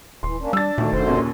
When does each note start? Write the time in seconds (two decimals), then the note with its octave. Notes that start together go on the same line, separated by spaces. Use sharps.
0.23 D#1 E3 C6
0.40 A#3 C#4 D4
0.53 G3 D4 E6 A6
0.78 D2 A#2 D#3 A3
0.93 F1 F#2 D3 C5
1.07 D#2 A#2 C#3